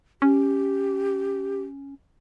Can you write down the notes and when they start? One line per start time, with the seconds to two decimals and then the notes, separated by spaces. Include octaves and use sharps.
0.22 C#4 G4